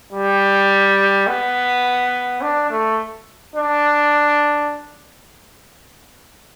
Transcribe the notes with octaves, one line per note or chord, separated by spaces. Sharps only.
G3
B3
D4
A3
D4